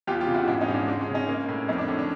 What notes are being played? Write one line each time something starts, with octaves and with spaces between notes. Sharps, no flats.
E2 F4 G4
F4 G4
C#3
E4 F#4
G#2 D4 E4
C#4 D#4
G#2
D4
G#3 D4
C#4
C#3
C#4 D#4
A#3
A2
F2 C#4 D#4
D4
D3 C#4
D4